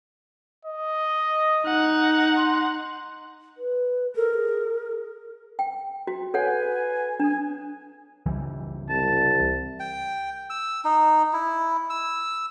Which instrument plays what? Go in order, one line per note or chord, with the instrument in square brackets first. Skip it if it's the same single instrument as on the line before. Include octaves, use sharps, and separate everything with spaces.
[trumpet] D#5
[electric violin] D#4 F#5
[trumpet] C6
[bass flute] B4
[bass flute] A4 [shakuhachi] A#4
[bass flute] G#4
[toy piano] G5
F#4
[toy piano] A4 C#5 F#5 [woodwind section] B4 G#5
[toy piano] D4 [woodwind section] G#5
[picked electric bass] C#2 E3 G3
[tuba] C2 [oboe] A5
[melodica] G5
E6
D#4
E4
E6